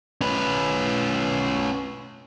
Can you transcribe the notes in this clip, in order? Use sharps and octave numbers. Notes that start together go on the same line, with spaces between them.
C#4 B4